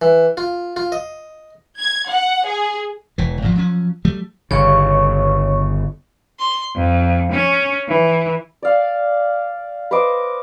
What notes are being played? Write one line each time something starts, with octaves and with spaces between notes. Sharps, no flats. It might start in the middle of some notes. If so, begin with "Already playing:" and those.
E3
F4
F4
D#5
G#6
F#5
G#4
E1 E3
G#1 F#2 A#2 F3
F3 F#3 B3 C#4
F#3 G3 A3
G1 C#3 C#5 C#6
C6
F2
C#4
E3
D5 F5
B4 C5 D#5 D6